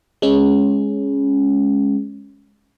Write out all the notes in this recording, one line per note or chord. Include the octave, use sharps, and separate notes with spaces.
G#3 C#4